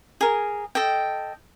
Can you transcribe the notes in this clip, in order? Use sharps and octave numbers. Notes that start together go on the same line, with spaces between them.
G#4 A#4
A4 D#5 G5